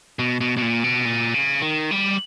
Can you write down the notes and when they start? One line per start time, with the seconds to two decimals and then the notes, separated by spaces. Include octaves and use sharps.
0.19 B2
0.41 B2
0.57 B2
0.62 A#2
0.84 B2
1.05 A#2
1.34 C#3
1.62 D#3
1.91 G3